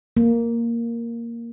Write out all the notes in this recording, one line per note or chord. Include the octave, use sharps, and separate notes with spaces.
A#3